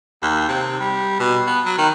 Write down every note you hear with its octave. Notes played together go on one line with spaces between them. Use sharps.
D#2
C3
G3
B2
B3
F#3
D#3